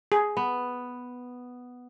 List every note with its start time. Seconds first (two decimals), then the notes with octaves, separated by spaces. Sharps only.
0.12 G#4
0.37 B3